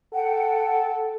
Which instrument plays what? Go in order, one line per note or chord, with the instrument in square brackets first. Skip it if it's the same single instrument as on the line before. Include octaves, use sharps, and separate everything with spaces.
[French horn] A4 [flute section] F#5 G5